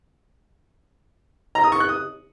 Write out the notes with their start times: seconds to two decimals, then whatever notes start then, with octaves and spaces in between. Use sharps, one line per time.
1.55 A#5
1.64 D#6
1.72 C#6
1.80 F#6
1.89 D#6